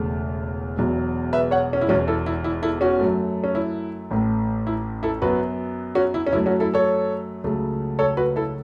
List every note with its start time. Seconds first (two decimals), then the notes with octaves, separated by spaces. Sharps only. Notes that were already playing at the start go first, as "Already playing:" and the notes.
Already playing: E1 E2 C#3 A3
0.77 E1 E2 B2 F#3
1.33 B4 E5
1.51 C#5 F#5
1.73 C#4
1.81 E4
1.89 E1 E2 B2 C#4 F#4
2.08 E4 A4
2.26 E4
2.44 E4
2.62 E4 A4
2.81 C#4 F#4
2.99 F#2 F#3 A3
3.44 C#4
3.55 E4
4.11 A1 A2 A3
4.67 E4
5.03 E4 A4
5.22 F#2 F#3 B3 F#4 B4
5.95 C#4 F#4
6.14 E4
6.27 C#4
6.32 F#2 F#3 A3 E4
6.46 C#4 F#4
6.60 E4 A4
6.74 A4 C#5
7.44 C#2 C#3 F#3 A3
7.99 A4 C#5
8.17 F#4 B4
8.36 E4 A4